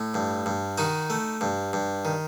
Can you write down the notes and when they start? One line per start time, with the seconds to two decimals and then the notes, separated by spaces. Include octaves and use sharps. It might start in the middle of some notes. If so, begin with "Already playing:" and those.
Already playing: A2
0.14 G2
0.46 G2
0.78 D#3 D#4 F#4
1.10 A3
1.41 G2
1.73 G2
2.05 D#3